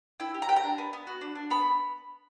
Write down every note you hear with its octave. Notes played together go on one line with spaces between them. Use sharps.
E4 G5
G4
A#5
G4 G5
A#5
D4
B3
B3
F#4
D4
D4
B3 B5